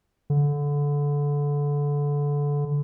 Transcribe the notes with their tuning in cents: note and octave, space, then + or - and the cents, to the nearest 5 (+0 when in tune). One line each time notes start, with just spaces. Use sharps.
D3 -20